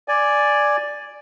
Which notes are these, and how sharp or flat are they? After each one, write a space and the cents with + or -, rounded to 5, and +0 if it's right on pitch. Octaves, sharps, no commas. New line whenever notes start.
D5 +0 G#5 +0